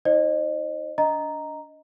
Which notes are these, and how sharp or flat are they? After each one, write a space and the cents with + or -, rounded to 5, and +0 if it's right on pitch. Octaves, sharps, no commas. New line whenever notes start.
D#4 +40 C5 +25 D#5 -35
D4 -25 D#5 +0 A#5 +0